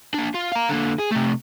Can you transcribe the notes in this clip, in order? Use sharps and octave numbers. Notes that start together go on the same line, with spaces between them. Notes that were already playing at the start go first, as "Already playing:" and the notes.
A#3 D4
F4
F5 A#5
D3 A#3
G#4
C3 A3